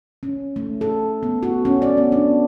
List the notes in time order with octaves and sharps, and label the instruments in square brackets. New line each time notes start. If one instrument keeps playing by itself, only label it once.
[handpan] C#4
A3
A4
B3
F#4
C#4
D5
B3
D4